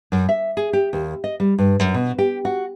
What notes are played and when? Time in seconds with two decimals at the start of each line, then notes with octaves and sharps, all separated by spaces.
0.12 F#2
0.29 E5
0.57 G#4
0.73 G4
0.93 D#2
1.24 D#5
1.40 G3
1.58 G2
1.79 F#2
1.94 B2
2.18 G4
2.45 F#4